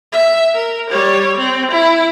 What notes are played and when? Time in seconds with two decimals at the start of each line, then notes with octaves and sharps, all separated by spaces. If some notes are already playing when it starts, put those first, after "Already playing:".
0.12 E5
0.54 A#4
0.90 G3 C#5
1.37 C4
1.71 E4